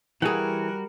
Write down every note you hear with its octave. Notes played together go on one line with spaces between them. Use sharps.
E3 G3 F#4 G#4 A#4 F#5